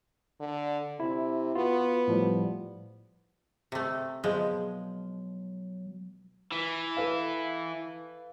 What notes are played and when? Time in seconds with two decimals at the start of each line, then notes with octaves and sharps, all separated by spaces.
0.40 D3
1.00 C3 E4
1.55 B3 F4 F#4
2.08 A2 F3 G3
3.72 C3 A3
4.24 B2 F3 F#3 G#3
6.52 E3
6.97 A4 B4 F5